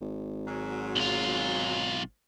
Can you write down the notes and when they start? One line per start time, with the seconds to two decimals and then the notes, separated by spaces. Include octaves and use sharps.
0.01 G#1
0.47 G#2 F#3
0.96 B1 F4